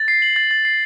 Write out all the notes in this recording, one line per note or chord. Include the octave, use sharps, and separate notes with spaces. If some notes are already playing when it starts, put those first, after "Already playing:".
Already playing: A6
C7
F#7
A6
A6
C7